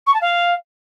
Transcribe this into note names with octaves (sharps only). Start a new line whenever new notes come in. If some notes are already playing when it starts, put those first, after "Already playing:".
C#6
A5
F5